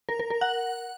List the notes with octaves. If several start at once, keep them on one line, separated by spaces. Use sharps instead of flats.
A#4
A#4
A#4
F#5